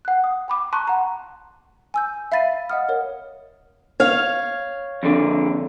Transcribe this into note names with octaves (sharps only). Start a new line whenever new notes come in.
F#5 F#6
D#6
G5 B5 D6
A5 A#5 C6 C#6 F#6
F#5 A#5
G#5 E6 G6
E5 F5 B5 A6 B6 D#7
D#5 F5 F#5 D#6 F6
A#4 C#5 F#5
C#5 F5
F2 D3